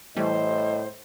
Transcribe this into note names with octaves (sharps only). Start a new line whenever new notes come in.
A2 E3 G3 A3 C5 D#5